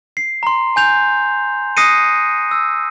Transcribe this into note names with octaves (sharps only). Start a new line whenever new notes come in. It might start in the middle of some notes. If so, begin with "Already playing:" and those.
C7
A#5 C6
G#5 G6 F7
D#6 F#6 A#6 C7 C#7 D#7
E6